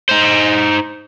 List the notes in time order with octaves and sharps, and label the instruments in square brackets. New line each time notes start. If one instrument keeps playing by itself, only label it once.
[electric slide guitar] D#4 C5